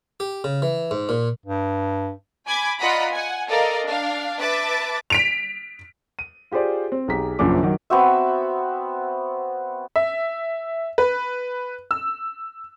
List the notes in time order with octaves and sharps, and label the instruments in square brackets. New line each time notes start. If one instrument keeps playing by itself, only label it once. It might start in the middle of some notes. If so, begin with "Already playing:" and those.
[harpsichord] G4
C#3
E3
G#2
A#2
[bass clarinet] G2
[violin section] G#5 B5 D6 G#6
F4 D5 D#5 F#5 A#5 B5
F#5 G#5
A4 A#4 D5 D#5 F5 A#5
D4 F5
B4 E5 A5 D6 A6
[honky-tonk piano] B6 D7 F7
[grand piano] D#7
F4 G4 G#4 C5 D5
C4
B1 G4 G#4 A#5 B6
A#1 F#2 C#3 F3 A#3 D6
D#3 F#3
[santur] B3 C4 F#4 E5
[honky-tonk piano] E5
B4
E6